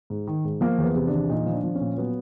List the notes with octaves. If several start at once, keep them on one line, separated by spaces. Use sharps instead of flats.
G#2
D#3
G#2
F3 A#3
E2
B3
C3
D4
E2
A#2 D#4
F3
D4
F3
C#4
A#2
F#3 B3